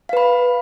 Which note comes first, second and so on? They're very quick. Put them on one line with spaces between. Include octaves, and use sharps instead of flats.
F5 B4 B5